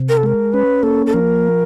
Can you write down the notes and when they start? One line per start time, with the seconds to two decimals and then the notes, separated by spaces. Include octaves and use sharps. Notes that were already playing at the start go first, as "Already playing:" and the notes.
Already playing: C3
0.09 A#4
0.17 A4
0.23 G#3 A#4
0.53 C#4 B4
0.83 A#3 A4
1.07 A4
1.13 F3 A#4